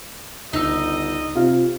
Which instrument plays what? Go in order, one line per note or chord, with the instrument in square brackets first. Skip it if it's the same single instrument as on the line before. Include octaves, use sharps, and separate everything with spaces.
[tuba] G1 [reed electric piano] C#2 E6 [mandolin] D#4 [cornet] D#5
[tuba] C3 [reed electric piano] F4 F5